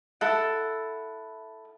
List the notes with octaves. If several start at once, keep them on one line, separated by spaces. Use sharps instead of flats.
E4 A4 F#5